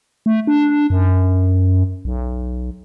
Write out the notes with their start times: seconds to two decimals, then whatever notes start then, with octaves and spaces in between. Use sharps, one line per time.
0.26 A3
0.47 D4
0.90 F#2
2.05 B1